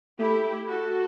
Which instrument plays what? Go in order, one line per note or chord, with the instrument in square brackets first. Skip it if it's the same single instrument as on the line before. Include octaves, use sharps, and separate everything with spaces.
[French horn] A3 [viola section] E4 G4
[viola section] F#4 A4